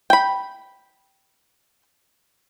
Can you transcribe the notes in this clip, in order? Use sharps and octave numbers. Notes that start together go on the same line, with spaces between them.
G5 B5